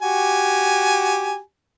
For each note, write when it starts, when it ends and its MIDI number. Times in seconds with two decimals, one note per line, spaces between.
0.02 1.38 66
0.02 1.38 67
0.02 1.38 80